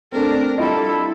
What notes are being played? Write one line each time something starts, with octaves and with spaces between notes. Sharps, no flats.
A3 C4 D4 A#4
G3 D4 E4 F4 A4 D#5